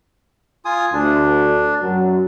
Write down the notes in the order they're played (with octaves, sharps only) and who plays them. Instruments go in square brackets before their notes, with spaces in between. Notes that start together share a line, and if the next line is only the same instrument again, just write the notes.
[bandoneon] F4 G#5 D#6
[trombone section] D2 [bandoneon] D4
[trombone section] F#2 F#3